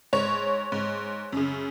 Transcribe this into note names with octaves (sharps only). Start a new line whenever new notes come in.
G#2 C#5
G#2
F#2 C#3